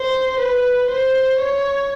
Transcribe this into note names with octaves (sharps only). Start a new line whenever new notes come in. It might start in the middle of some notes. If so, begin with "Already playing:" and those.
Already playing: C5
B4
C5
C#5